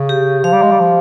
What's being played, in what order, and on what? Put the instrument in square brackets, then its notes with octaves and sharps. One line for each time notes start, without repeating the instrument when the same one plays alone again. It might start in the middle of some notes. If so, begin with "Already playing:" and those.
Already playing: [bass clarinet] C#3
[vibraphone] G4
[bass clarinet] F3 [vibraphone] F5
[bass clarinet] G3
G#3
G3
F3